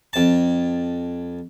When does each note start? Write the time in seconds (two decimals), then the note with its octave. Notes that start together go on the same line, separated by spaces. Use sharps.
0.13 F2 A5